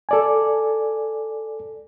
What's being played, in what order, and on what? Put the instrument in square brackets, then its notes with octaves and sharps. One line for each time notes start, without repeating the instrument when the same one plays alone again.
[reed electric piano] A4 D5 G#5